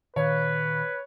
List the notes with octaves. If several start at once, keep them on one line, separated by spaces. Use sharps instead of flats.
A#2 D#3 B4 C#5 F5